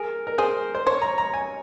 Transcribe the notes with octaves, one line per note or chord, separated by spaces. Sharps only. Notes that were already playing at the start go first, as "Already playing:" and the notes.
Already playing: G#4 A#4
A#4
G#4 C5
C5
C5 C#5
A#5
A#5
G#5